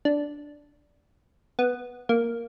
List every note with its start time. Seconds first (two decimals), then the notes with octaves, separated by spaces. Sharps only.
0.05 D4
1.59 B3
2.09 A#3